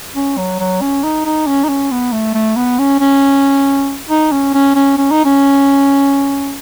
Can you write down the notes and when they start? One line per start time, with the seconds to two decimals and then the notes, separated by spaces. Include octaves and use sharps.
0.16 C#4
0.38 F#3
0.60 F#3
0.81 C#4
1.04 D#4
1.26 D#4
1.47 C#4
1.64 D#4
1.69 C#4
1.91 B3
2.12 A3
2.34 A3
2.56 B3
2.79 C#4
3.00 C#4
4.09 D#4
4.32 C#4
4.54 C#4
4.75 C#4
4.98 C#4
5.11 D#4
5.25 C#4